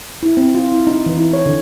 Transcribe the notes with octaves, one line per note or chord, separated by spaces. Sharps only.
E4
C4
F4
E4
D#4
E3
E4
C#5
D3